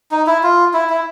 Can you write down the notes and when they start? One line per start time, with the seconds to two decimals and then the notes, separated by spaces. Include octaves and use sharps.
0.11 D#4
0.27 E4
0.43 F4
0.74 E4
0.89 E4